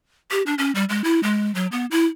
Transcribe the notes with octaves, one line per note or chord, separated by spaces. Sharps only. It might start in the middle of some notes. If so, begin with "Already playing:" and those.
G4
D4
C#4
G3
G#3
E4
G#3
F#3
B3
E4